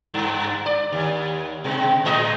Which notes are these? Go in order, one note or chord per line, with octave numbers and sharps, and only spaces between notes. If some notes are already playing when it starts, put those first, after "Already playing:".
G2
D5
D#2
B2 G#3
A2 G#3 D#5